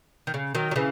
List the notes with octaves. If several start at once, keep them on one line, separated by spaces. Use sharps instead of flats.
D#3
C#3
D#3 F#3
F#3
C#3 E3